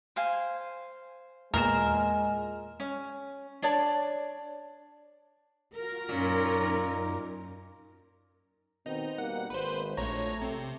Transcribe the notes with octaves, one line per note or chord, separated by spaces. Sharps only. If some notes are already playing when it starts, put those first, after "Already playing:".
C5 F5 G#5
E2 A#2 G#3 A#4 E7
C#4
D4 C#5 D5 A5
F4 F#4 A#4
F#2 A#2 C#4 D#4
B2 D#3 C4 D#4
B2 G3 A#3 F#5
G#1 B4 C5
A#1 A3 C#5 A#5
C3